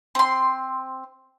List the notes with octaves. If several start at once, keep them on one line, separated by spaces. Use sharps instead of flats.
C4 C6